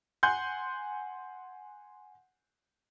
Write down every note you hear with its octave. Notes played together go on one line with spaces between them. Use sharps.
F#5 G#5 C6 F#6 G6